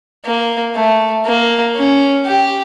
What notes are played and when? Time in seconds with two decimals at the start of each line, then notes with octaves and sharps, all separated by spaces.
0.25 A#3
0.75 A3
1.25 A#3
1.76 C#4
2.26 G4